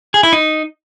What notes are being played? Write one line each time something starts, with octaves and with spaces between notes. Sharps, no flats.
G#4
E4
D#4